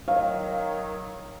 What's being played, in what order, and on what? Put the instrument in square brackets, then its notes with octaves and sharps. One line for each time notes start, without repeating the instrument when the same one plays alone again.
[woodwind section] D#3 F#3 [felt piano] F5